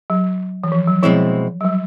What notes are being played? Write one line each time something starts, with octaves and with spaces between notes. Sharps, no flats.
F#3
E3
F3
F#3
B2 F3 G#3 C4 E4
F#3
G3